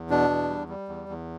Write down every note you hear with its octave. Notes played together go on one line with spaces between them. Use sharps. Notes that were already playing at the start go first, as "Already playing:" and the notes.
Already playing: E2
B2 D4
E2
G3
G3
E2
E2